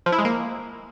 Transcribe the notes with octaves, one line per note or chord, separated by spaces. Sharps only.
F3
E4
G#3
A#3